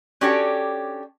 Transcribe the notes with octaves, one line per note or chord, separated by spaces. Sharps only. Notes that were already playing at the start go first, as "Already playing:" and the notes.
C#4 D4 F#4 G4 A4 C#5